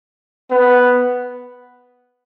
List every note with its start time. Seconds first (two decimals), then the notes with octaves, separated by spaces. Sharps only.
0.51 B3